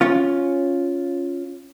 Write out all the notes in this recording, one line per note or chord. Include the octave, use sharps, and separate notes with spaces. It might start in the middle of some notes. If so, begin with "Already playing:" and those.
C#4 F4